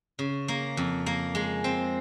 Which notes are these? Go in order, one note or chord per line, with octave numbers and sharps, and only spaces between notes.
C#3
A#3
F2
A#3
G#3
C4